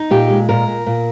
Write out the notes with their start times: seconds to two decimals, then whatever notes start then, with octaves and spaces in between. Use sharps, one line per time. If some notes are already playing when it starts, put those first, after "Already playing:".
Already playing: D#4
0.11 A#2 G4
0.30 G#3
0.49 A#2 A#4
0.68 A#2
0.86 A#2